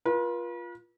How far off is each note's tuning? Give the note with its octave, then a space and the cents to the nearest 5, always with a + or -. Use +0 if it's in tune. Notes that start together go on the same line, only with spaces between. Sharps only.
F4 +0 B4 -45